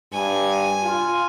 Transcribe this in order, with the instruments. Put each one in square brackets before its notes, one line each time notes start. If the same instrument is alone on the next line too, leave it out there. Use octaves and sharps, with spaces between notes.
[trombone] G2 [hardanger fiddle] G#5
[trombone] F4